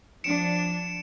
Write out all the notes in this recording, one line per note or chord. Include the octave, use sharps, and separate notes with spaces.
F3 D4 C#7 D7 E7